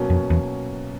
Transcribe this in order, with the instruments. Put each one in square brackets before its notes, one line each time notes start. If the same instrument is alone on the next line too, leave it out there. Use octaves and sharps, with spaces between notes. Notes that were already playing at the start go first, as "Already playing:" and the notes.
Already playing: [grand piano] B2 F#3 A#3 C#4
[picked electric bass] F2
E2